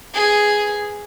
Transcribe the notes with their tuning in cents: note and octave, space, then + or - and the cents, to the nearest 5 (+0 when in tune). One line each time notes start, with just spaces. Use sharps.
G#4 +0 B4 +0